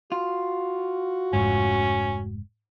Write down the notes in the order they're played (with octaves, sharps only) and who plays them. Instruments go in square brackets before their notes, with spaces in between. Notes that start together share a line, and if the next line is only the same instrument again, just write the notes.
[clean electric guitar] F4 [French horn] F#4
[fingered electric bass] F1 G#2 [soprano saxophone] C#4